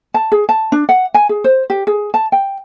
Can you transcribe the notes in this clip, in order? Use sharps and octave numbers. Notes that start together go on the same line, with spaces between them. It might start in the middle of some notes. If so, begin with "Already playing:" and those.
A5
G#4
A5
D4
F#5
G#5
G#4
C5
G4
G#4
A5
G5